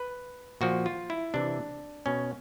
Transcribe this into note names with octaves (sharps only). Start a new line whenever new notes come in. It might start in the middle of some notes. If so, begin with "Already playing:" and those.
Already playing: B4
A#2 F3 F#4
F4
E4
C3 E3 D4
B2 C#4